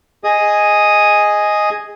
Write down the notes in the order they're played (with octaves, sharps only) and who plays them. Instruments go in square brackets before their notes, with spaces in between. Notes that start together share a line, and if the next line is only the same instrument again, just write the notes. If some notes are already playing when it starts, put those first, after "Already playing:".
[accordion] G#4 D#5 D#6